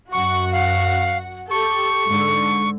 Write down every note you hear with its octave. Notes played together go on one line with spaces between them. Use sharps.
F#2 F#4 F#5 C#6
F5
G4 A4 C#6
G#2 D3